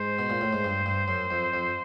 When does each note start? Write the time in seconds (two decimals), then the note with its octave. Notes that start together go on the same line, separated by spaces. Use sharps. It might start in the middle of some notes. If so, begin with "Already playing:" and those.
Already playing: G#2 C5
0.19 B2
0.30 A#2
0.41 A2
0.53 G#2
0.64 G2
0.86 G2
1.08 F#2
1.31 F2
1.54 F2